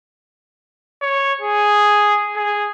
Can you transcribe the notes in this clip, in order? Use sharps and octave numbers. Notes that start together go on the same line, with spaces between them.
C#5
G#4
G#4